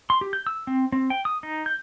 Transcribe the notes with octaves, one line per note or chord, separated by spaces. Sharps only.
C6
G4
G6
E6
C4
C4
G5
D#6
D#4
G6